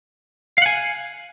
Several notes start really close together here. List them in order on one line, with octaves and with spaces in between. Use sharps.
F5 F#5 G#5